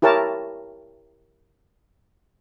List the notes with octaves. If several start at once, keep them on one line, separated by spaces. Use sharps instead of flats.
E4 G4 A#4 C#5 A5